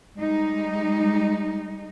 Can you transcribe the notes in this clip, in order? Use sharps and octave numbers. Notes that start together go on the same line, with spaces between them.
G3 G#3 D#4